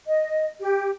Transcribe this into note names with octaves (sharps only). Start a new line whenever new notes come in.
D#5
G4